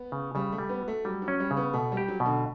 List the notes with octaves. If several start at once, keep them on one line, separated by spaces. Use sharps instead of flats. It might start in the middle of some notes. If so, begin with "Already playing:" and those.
Already playing: B3
C#3
C#3 G3
A3
G3
B3
F#4
A3
F#3 G3
F#3
C#4
G3
C#3
B3
B2 A3
G3
G4
F#3
B2
D3